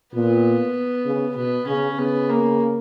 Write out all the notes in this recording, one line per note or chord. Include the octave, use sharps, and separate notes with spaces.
A#2 B3
C#3
B2 B3
C#3 C#4
C#3 B3
A#3